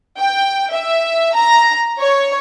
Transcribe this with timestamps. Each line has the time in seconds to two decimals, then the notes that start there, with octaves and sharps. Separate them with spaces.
0.18 G5
0.73 E5
1.36 A#5
2.00 C#5